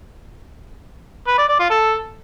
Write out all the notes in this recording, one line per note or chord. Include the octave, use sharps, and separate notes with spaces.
B4
D5
D5
F4
A4